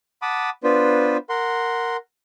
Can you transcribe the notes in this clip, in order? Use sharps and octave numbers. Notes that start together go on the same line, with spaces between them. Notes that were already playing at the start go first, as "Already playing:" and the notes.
F#5 A5 B5 D6 D#6
B3 D4 F4 B4 C5
A#4 F#5 C6